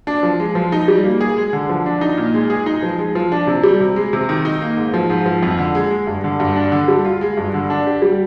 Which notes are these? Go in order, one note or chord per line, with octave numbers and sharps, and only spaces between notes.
D4
F3
G#3
F3
D#4
G3
A#3
G#4
G#3
D3
F3
D4
D#4
A#2
G#3
G#4
D#4
F3
G#3
F3
D4
C3
G3
C3
G#3
C3
D#3
D#4
A#3
G#2
F3
G#2
F3
F2
D3
G#3
G#3
G2
D3
G2
D4
D3
G3
F4
G#3
G2
D3
D4
G4
G3